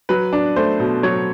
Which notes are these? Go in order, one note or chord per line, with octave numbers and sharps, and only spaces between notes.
F#3 B4
D4
A3 C5
B2
F#3 C#5